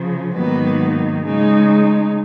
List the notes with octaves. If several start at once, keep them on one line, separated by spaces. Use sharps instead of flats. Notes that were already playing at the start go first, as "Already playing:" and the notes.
Already playing: C#3 F3
G#2 D#3 F#3 A#3 B3 D#4 B4
C#3 G#3 D#4